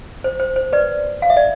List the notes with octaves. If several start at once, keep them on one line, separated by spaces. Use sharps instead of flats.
C5
C5
C5
B4 D5
F5
E5
D5